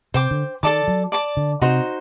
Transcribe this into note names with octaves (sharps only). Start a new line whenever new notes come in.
C3 C5 G5 D6
D3
D#3 A4 D5 A5 D6
F#3
D5 A5 D6
D3
C3 D#4 F#4 C5